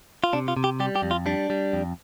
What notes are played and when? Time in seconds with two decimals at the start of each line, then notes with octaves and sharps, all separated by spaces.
0.24 F4
0.33 C3 D4
0.48 F4
0.57 C3
0.64 G4
0.80 G3 G4
0.96 G4
1.02 F2
1.11 F4
1.26 G3 D4
1.50 G3
1.73 F2